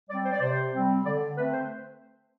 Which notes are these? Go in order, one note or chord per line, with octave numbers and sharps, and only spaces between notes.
G3 C4 D5
C5
D5
C3 C5
G3 C4
D3 D5
A3 C4 B4
C5